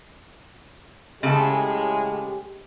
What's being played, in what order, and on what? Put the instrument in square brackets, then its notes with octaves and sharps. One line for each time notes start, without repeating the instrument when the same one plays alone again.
[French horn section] A2 G#3 [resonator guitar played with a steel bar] C#3 A4 A5 [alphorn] G4